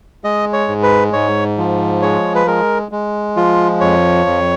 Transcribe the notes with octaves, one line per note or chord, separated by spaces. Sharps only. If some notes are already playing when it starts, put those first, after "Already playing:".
G#3 D#5
C#5
G#2
B4
G#2 C#5
F3
G#3 C#5
B4
G#3 A#4
G#3
F3 F4
F2 C#5
F2